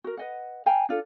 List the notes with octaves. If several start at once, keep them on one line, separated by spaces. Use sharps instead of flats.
F#4 A#4
B4 D#5 F#5
F5 G5 G#5 A#5
D4 F4 A4